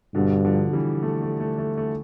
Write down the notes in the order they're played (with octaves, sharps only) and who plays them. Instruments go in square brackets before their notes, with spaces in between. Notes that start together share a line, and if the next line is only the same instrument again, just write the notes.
[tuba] G2 [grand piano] B2 D3
[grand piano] D3 F3
E3 G3
A3
A3
A3
A3
A3